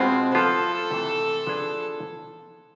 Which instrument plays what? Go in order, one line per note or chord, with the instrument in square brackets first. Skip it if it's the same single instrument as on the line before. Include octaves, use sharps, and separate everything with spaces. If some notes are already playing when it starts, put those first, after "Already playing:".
Already playing: [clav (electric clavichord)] B2 G#3 B3 F4 [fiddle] C4
[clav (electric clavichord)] F3 B3 F4 [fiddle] A4
[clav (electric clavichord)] C3 E3 A3
F3 B3 D4 G#4